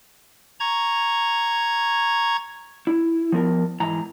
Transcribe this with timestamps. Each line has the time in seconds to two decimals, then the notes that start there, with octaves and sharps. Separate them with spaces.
0.60 A#5 C#6 G#6
2.87 E4
3.32 F3 B3 A#4
3.80 G#2 E3 A#5